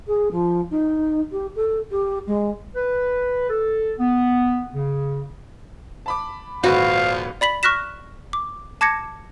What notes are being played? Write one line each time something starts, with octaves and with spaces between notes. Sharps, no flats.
G#4
F3
D#4
G4
A4
G4
G#3
B4
A4
B3
C#3
A5 B5 D6
D#1 G#1 F3 F#4 B4 F5
D5 B5 B6 F#7
C#6 F6 F#6 A#6 B6 E7
D6
A5 D6 G#6 A#6 C#7